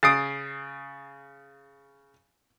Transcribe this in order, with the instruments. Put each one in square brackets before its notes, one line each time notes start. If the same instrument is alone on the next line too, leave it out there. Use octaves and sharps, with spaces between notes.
[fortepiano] C#3 D#6 [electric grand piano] A6 C7 D7